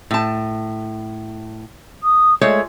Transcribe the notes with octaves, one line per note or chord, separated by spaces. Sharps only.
A2 A5
D#6
G#3 A3 F4 C#5